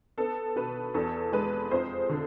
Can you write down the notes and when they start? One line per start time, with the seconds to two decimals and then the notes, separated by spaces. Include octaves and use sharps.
0.18 B3 A4
0.56 B2 B4
0.94 E2 A4
1.32 G#3 B4
1.71 F2 C5
2.09 D3